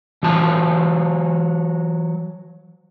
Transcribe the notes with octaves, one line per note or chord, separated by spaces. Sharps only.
E3 F#3 A5